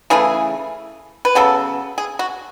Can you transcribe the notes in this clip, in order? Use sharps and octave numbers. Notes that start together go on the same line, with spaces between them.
C#3 E3 A3 G#4
B4
C#3 F#3 B3 A4
G#4
F#4